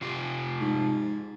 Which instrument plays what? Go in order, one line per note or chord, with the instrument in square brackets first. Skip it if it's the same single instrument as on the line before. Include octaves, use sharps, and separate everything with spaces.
[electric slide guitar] C3 F4 G4
[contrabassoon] G#2